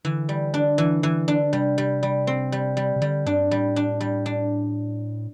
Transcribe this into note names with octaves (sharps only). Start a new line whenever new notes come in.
D3 E3
G3
D4
E3
E3
D4
C3 G3
G3
G3
C4
G3
G3
C3
D3 G3
G2 D4
A2 G3
D4
G3
D4